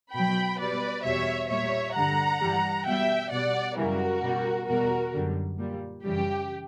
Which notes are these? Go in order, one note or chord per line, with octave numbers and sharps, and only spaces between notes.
B2 F#3 G5 B5
B2 G3 B4 D5
E2 B2 G3 C#5 E5
A#2 G3 C#5 E5
G2 D3 G3 F#5 A#5
G2 E3 G3
B2 G3 E5 G5
B2 G3 D5 F#5
F#2 C#3 E3 G3 F#4 A#4
B2 G3
E2 B2 G3 F#4 A#4
F#2 D3 G3
A#2 G3
F#2 C#3 E3 G3 G4